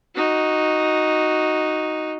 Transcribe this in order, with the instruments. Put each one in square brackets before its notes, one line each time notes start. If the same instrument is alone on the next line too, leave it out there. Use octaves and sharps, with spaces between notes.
[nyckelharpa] D#4 F#4